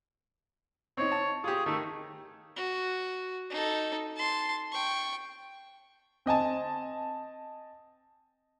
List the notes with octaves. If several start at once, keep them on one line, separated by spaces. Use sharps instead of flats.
C4 D#4 C#5
A5
F4 G4 G#4
D#3 A3
F#4
D#4 A4
A5 C6
G5 C#6
C4 D#5 G#5 A5